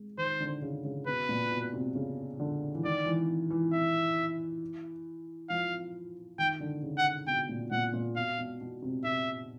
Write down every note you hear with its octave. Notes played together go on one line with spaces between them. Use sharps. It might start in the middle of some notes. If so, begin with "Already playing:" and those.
Already playing: G#3
D#3 C5
D3
C#3
C#3
B2 B4
A#2
B2
C3
C#3
D3
E3
D#3 D5
E3
E3
E5
F3 F5
D#3 G5
D3
C#3
F#5
B2 G5
A#2
A#2 F#5
A#2
B2 F5
B2
B2
C3
C3 E5